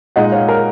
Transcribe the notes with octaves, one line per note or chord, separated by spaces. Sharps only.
A#2 G#3 D#4 D#5 F#5
C#5 F5
A#4